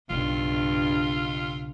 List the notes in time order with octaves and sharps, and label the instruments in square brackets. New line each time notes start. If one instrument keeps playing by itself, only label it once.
[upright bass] B1 C#3 [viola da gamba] G2 [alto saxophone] F4